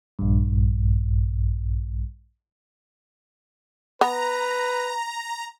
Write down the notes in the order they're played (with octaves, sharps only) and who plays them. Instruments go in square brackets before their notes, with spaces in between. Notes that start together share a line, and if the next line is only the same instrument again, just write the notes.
[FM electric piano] A#1 G2
[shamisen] B3 [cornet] B4 [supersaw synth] A#5